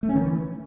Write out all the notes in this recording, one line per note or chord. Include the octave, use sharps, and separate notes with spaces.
A3
C#4
D#3
E3